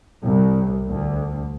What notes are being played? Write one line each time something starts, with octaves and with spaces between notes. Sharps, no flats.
C2
D2